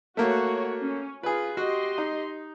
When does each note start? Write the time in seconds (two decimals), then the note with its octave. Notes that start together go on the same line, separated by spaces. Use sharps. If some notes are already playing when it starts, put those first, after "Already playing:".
0.17 A3 A#3 F#4 C#5
0.83 C#4
1.23 F4 G#4 B4
1.57 F#4 G4 D#5 C6
1.98 D#4